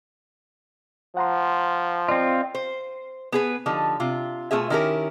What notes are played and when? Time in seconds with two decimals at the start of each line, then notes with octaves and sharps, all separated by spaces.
1.17 F3 F#5 A#5 C6
2.09 C4 F4 D5 D#5
2.54 C5
3.32 B3 G#4 B4
3.66 D3 F3 D#4 G4
4.00 C3 F4
4.51 B2 A3 C4 F4 G#4 E5
4.70 D#3 C#4 E4 G4 A#4